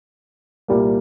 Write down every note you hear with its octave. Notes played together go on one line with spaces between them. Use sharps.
C2 A#2 G3 A#3